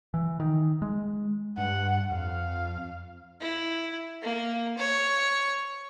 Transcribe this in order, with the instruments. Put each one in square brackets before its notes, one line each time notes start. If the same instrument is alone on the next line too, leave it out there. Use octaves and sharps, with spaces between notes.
[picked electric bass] E3
D#3
G#3
[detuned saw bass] G2 [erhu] F#5
[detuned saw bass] F2 [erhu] F5
[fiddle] E4
A#3
C#5